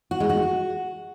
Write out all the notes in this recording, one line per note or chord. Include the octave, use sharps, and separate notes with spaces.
F#4
G#3
F#4